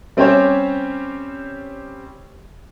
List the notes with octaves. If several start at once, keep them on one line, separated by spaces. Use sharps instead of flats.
G3 C4 C#4 G4 C5 C#5